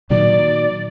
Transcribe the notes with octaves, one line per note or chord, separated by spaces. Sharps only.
A#2 D#3 F#3 D5